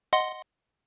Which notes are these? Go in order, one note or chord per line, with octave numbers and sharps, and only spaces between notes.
D#5 F#5 C6